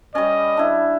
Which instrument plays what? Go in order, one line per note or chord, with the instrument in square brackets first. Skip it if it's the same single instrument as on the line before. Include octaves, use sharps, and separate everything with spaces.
[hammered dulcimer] G3 C#4 [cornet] D#5
[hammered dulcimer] D4 E4